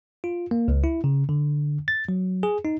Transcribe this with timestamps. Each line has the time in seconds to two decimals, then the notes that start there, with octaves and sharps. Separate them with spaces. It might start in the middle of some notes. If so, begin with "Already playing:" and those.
0.24 F4
0.51 A#3
0.68 C#2
0.84 E4
1.04 C#3
1.29 D3
1.88 A6
2.09 F#3
2.43 G#4
2.65 D#4